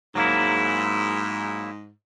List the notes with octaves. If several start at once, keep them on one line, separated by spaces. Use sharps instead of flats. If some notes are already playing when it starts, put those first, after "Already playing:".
G#2 F#3 A#3 E4